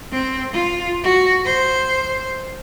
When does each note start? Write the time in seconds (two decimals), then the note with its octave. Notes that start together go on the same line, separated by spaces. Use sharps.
0.12 C4
0.53 F4
1.03 F#4
1.45 C5